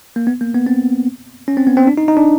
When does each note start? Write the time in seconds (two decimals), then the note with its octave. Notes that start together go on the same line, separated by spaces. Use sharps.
0.16 A#3
0.27 B3
0.41 A#3
0.54 B3
0.67 C4
1.48 C#4
1.57 C4
1.67 B3
1.77 C4
1.87 D4
1.98 D#4
2.08 D#4
2.17 D4